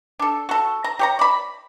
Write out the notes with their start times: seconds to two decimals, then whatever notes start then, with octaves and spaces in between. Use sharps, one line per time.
0.19 D4 A4
0.49 F#4 A4
0.84 A#5
0.99 G4 C#5 A#5
1.19 D5 B5